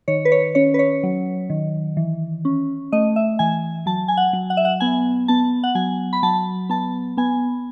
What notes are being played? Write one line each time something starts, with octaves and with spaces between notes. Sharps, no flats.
D#3 C#5
B4
C#5
C#4 C#5
B4
C#5
F#3
D#3
E3
C#4
A3 D#5
E5
E3 G#5
F#3 A5
G#5
F#5
F#3
F#5
E5
F#5
B3 G#5
B3 A5
F#5
F#3 G#5
B5
F#3 A5
B3 A5
B3 G#5